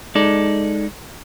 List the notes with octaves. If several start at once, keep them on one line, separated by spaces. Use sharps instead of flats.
G#3 D#4 A4 D5